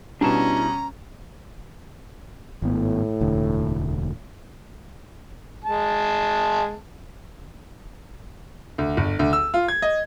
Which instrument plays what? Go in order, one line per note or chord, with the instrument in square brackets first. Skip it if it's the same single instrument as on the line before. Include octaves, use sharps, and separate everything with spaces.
[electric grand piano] B2 G3 [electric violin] C#4 [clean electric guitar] D4 E4 A5 [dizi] A#5
[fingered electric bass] G#1 B3 [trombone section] A2
[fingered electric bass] E1 D2 D3
[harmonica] G#3 A5
[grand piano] D2
G1
D2
E6
F4
G#6
D#5